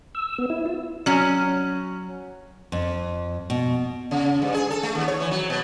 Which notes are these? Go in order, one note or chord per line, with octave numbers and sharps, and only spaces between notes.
E6
B3
E4
F4
F#3 C#4
F2
B2
C#3
G2
G#4
A4
A3
D#2
C#5
E3
F#3
B2